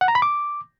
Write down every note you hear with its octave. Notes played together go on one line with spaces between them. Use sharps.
F#5
A#5
B5
D6